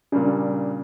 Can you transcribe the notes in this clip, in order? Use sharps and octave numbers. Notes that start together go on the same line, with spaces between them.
A#2 C#3 G3 D4